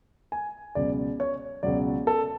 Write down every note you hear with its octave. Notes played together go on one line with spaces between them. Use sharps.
G#5
C#2 B2 F#3 D5
C#5
C#2 B2 F#3 D5
A4